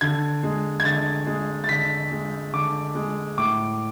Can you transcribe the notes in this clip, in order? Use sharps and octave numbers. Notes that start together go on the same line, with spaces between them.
D3 G#6
G#3
G#6
D3 A6
G#3
A6
D3 B6
G#3
D3 D6
G#3
A2 D6